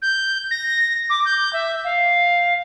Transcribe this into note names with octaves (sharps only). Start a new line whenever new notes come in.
G6
A#6
D6
G6
E5
F5